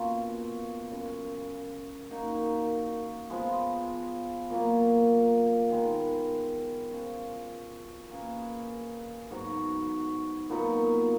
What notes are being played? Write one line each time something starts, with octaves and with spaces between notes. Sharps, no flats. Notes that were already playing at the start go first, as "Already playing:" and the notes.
Already playing: B2 A#3 C#4 F4
F#2 C#3 G#3
A#3 D#4 F#4 A#4
F3 G#3 B3
A#2 F#3 A#3
D#3 G#3 B3
F3 G#3 C#4
A#3 C#4 G#4 B4
G#2 F#3 B3 F#4
A#2 F#3 B3 D#4